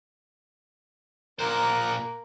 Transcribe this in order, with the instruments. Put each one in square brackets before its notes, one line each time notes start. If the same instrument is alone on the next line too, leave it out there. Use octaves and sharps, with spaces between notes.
[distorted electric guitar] A#2 C5 [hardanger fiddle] A#3 [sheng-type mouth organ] A#4 F#6